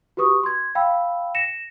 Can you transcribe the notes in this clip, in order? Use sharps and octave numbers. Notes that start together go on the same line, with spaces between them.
F#4 G4 B4 C#6 D#6
C6 G#6
F5 G5 B5 E6
A#6 C#7 E7